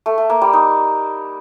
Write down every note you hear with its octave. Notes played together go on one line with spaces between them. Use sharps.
A3
A3
A#3
G3
D#4